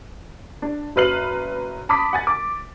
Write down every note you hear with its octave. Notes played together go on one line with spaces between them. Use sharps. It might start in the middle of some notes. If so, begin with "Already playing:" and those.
D4
F#1 F#3 B4 F6 C7 F#7
A5 B5 D6 D#6 B6
F#5 G#5 A6
D6